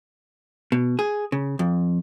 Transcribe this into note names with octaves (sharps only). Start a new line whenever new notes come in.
B2
G#4
C#3
F2